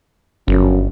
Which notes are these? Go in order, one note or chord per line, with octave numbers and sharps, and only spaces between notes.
G1 F#2